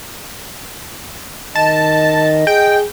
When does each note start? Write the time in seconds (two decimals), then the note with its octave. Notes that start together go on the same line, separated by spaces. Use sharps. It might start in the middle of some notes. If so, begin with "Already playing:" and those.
1.55 D#3 D#5 A5
2.47 G#4 G5